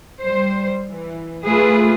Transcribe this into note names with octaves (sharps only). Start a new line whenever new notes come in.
G3 C5
E3
A3 F4 G#4 B4